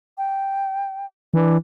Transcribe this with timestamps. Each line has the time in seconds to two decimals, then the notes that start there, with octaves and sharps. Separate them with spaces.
0.18 G5
1.34 E3 D4